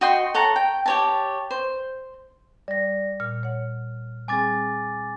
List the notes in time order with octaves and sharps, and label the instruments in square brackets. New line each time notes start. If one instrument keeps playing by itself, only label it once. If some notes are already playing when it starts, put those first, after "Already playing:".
[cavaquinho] F#4 D#5 G5 C6
A4 C#5 F#5 A#5
G5
G4 C#5 A5
C5
[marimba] G3 [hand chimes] D5 A#6
[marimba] A#2 [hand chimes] F6
[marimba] C#5 F#5
[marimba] G3 C4 G#4 [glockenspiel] G#5 D6 A6